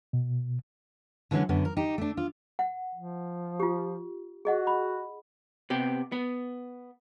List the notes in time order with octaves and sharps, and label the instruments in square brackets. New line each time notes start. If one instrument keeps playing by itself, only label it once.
[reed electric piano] B2
[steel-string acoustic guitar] D3 E3 F#3 G#3 C#4
F#2 D3 B3
A#4
D#4 G4
A3 D4
F4
[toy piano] F#5
[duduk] F3
[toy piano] F4 G4
[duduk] F#4 [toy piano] G#4 D#5 F#5
[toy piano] B5
[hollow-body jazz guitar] C3 B3 G4
B3